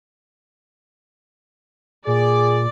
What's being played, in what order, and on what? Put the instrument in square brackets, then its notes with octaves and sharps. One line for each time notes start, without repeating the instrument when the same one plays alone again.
[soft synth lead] A#2 [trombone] G#4 [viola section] D5